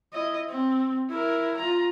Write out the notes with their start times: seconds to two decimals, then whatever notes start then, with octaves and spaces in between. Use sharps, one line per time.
0.13 E4 D#5
0.49 C4
1.09 E4 A#4
1.58 F4 A#5